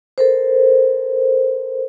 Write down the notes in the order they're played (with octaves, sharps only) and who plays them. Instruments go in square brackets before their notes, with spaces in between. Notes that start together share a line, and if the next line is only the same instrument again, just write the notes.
[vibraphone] A4 A#4 C5